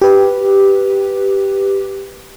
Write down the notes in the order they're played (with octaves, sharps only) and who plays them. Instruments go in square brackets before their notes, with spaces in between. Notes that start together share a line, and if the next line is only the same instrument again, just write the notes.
[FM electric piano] G4 B4